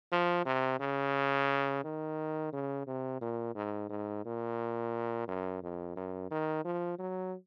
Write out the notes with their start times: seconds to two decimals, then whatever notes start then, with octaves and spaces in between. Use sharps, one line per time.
0.12 F3
0.45 C3
0.80 C#3
1.84 D#3
2.53 C#3
2.87 C3
3.21 A#2
3.55 G#2
3.89 G#2
4.25 A#2
5.28 F#2
5.63 F2
5.96 F#2
6.31 D#3
6.65 F3
6.99 F#3